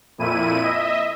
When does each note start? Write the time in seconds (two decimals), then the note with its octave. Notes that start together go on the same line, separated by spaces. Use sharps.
0.18 F2 A#2 E4 D#7
0.62 D#5 E5